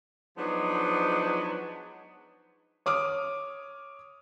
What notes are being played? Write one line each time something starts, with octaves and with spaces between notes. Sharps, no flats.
F3 F#3 G#3 B3 D4 D#4
C#5 D6 D#6 F6